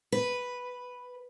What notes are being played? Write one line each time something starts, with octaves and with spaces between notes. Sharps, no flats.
B4